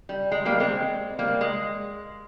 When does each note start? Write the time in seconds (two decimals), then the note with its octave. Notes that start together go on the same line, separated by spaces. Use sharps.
0.09 G3
0.32 G#3
0.45 G3 A#3
0.60 G#3 C4
1.19 G3 A#3
1.41 G#3